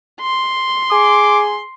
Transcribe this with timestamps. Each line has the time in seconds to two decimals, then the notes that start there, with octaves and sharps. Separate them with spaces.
0.20 C6
0.92 G#4 D6